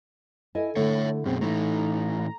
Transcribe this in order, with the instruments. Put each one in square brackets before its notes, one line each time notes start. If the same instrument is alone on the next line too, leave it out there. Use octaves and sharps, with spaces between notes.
[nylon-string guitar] E4 A4 D#5 [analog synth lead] G#5
[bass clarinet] D3 [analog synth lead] A3 [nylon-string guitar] D4 E4 [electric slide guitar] C#5 E5
[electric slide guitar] F#2 B2 [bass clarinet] C4 [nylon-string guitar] G#4
[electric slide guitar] A2 E3 [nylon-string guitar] A3 [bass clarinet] D#4 [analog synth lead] A#5